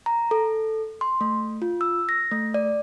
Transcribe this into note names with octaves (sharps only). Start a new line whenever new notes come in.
A#5
A4
C6
A3
F4
E6
A#6
A3
D5